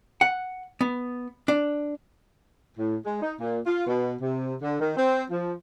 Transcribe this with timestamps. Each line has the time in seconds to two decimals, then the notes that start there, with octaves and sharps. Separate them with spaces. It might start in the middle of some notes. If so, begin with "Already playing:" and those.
0.21 F#5
0.81 B3
1.48 D4
2.77 A2
3.05 G#3
3.22 D#4
3.40 A#2
3.66 F4
3.87 B2
4.21 C3
4.62 D3
4.80 D#3
4.97 C4
5.30 F3